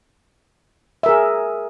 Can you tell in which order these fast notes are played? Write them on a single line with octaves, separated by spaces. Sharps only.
E5 A#4 G#4